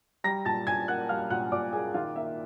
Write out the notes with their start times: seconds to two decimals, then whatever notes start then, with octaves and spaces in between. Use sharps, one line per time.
0.24 G3 A#5 A#6
0.45 A#2 A5 A6
0.67 A#2 G#5 G#6
0.88 A#3 F#5 F#6
1.09 G3 F5 F6
1.30 A#2 F#5 F#6
1.52 A#2 D5 D6
1.73 A#3 G#4 G#5
1.94 D#3 F4 F5
2.16 A#3 E5